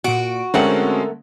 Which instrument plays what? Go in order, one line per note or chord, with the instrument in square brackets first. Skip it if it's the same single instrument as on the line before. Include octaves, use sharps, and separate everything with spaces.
[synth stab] A#2 D7 [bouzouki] F#4
[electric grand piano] D3 G#3 C#4 [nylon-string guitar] A3 A#4 F#5 [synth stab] C4